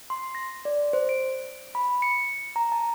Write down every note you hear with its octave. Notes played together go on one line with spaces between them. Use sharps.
C6
A#6
D5
C5
D7
B5
C#7
A#5
A5